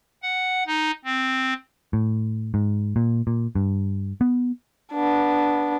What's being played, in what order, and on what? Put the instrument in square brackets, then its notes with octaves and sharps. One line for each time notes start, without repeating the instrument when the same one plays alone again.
[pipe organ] F#5
D#4
C4
[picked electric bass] A2
G#2
A#2
A#2
G2
B3
[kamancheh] B3 D4